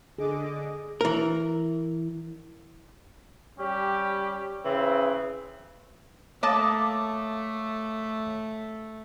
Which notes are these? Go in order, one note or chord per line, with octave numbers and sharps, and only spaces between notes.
D3 G#4 D#5 D6
E3 A#4
G3 C#4 G4
C#3 E3 C4
A3 A#3 C#5 D#5 F5 A5 D6